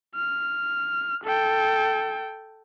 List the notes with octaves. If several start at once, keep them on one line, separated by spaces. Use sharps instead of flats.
F6
A4 G5